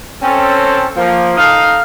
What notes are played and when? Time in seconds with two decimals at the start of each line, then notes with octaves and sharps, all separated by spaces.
0.22 C4 C#4 A4
0.97 F3 A#3
1.37 D#4 A4 D#5 F5